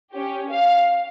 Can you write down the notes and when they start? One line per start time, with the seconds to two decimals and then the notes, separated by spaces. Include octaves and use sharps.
0.14 C#4 G4
0.51 F5